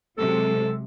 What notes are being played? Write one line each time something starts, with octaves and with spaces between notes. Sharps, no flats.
C3 F#3 G#3 A4